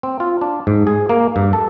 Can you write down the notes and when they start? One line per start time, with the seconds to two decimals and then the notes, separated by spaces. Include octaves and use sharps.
0.03 C4
0.20 F4
0.41 D4
0.67 G#2
0.87 G#4
1.09 A#3
1.36 G2
1.53 A4